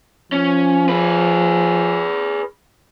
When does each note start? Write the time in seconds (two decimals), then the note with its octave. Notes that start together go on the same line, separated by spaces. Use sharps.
0.32 F3 C#4
0.89 G#4 B4